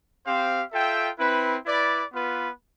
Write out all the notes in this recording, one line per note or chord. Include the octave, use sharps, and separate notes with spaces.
C4 G4 C5 F5
F4 A4 E5 G5
C4 E4 B4
E4 B4 D5
B3 F4 B4